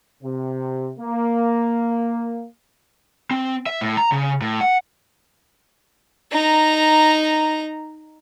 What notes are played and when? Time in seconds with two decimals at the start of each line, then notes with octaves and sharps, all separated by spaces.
0.23 C3
0.99 A#3
3.31 C4
3.66 E5
3.81 A2
3.97 A#5
4.12 C#3
4.41 A2
4.61 F#5
6.32 D#4 A#5